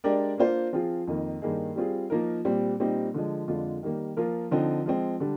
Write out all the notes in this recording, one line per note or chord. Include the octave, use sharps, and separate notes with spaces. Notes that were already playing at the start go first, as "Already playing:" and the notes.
G#3 D4 G4 A#4 D5
A#3 D4 F4 C5
F3 C4 F4 G#4
F2 D#3 A#3 D#4
G2 D#3 A#3 D#4 G#4
G3 C4 F4 G#4
F3 A#3 D#4 A#4
A#2 G3 C4
A#2 G3 C4 D#4
D3 F3 G#3
F2 D3 G#3 D4 F4
D#3 G3 A#3
F3 A#3 F4 A#4
D3 F3 C4 D#4
F3 G#3 C4
D3 G3 D4